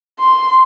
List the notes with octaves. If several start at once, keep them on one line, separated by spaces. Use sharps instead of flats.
C6